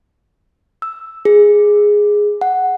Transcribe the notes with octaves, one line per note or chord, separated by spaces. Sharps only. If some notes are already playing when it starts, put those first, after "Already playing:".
E6
G#4
F#5